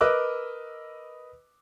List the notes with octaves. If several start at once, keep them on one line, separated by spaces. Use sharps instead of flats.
A#4 B4 D#5 D6 E6 F#6